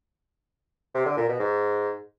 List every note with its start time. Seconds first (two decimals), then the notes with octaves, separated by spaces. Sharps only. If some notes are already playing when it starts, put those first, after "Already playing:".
0.94 C3
1.06 D3
1.17 A#2
1.28 B2
1.40 G#2